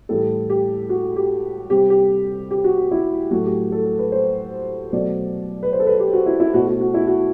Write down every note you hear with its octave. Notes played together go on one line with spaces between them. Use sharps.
A2 E3 G3 A4
G4
F#4
G4
C3 G3 G4
G4
G4
F#4
F#4
E4
A2 F#3 A3 F#4
G4
A4
A4
B4
C5
B2 F#3 A3 D5
B4
C5
A4
B4
G4
F#4
E4
E4
B2 A3 F#4
F#4
F#4
E4
F#4